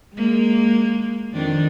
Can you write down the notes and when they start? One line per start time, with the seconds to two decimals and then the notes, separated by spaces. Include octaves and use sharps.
0.14 G#3 A#3
1.33 F2 D#3 D4